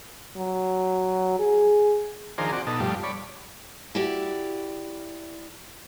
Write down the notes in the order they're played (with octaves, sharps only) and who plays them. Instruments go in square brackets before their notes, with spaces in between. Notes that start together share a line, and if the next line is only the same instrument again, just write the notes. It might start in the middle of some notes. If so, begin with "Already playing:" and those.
[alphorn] F#3
G#4
[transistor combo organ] D#3 F3 D4 G#4 A#4 C5
C4 F#4 D5
B2 D#4 A4
G2 F3 G3 A3
C#5 D5 B5
[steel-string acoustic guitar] E4 F#4 G4 D5 E5